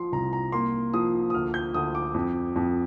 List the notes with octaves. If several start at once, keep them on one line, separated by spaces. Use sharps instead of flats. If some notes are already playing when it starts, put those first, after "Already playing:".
Already playing: F3 C6
C2 A#5
A#5
A#3 C6
F3 D#6
D#6
D2 F6
G6
D2 D#6
D6
F2
F2